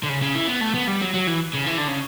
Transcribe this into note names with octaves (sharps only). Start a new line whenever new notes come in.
D3
C#3
C#3
E3
B3
A3
B3
G3
F#3
F#3
E3
C#3
E3
D3
C#3